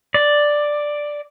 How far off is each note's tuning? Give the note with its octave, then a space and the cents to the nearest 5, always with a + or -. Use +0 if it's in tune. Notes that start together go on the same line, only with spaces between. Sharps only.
D5 +5